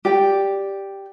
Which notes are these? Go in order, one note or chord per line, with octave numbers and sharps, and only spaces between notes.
G4 D5 G5